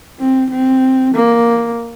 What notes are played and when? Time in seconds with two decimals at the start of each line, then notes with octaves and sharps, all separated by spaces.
0.20 C4
0.51 C4
1.14 A#3